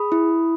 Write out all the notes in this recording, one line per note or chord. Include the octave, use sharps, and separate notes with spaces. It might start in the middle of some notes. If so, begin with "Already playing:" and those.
Already playing: G#4 B5 D#6
E4